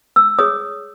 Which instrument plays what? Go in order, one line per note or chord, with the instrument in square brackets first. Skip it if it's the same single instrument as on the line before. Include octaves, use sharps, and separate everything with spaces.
[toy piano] E6
G#4 C#5 D#6